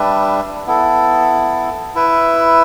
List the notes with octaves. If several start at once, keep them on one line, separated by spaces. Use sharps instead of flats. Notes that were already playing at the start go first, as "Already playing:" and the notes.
Already playing: G3 D4 B4 E5
B3 E4 A4
E4 B4 E5